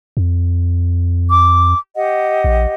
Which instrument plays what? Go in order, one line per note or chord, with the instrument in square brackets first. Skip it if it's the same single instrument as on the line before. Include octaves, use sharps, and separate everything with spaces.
[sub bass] F2
[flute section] D6
G4 D#5 F#5
[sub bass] A#1